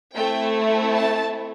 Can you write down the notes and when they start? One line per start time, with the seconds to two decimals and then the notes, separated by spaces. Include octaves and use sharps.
0.14 A3 C4 E4 G5
0.96 A5